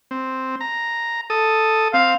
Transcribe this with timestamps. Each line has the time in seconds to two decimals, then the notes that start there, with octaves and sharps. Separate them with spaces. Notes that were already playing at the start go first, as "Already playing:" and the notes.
0.11 C4
0.61 A#5
1.30 A4 D#6
1.94 C4 F5